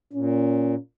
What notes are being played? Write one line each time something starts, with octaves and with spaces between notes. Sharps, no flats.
A#2 C#4